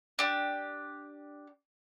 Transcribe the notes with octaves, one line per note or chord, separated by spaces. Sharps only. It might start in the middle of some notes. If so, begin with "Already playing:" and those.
D4 G4